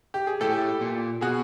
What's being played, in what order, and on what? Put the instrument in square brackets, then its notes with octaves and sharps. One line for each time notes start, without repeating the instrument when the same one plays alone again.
[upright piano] G4
G#4
[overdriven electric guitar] A2 [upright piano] G4 A4
[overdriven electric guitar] A#2
[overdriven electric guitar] B2 [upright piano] F#4 G#4